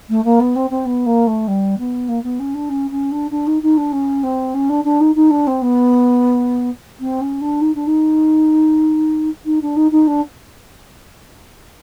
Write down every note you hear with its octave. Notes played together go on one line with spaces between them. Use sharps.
A3
A#3
B3
C4
C4
B3
A#3
A3
G3
B3
A#3
B3
C#4
D4
C#4
C#4
D4
D4
D#4
D#4
D4
C#4
C4
C#4
D4
D4
D#4
D#4
D4
C4
B3
C4
C#4
D4
D#4
D4
D#4
D#4
D4
D#4
D#4
D4